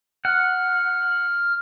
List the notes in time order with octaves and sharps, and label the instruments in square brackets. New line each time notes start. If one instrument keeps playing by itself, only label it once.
[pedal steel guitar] F#5 [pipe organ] F6